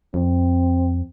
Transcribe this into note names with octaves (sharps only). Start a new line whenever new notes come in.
F2 C4